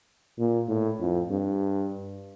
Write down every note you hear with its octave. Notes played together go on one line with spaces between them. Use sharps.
A#2
A2
F2
G2